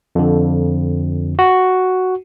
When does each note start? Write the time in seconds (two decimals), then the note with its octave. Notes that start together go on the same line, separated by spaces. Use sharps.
0.15 F2 D3
1.39 F#4